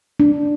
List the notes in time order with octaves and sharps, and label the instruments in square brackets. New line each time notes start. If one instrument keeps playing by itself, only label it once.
[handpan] D4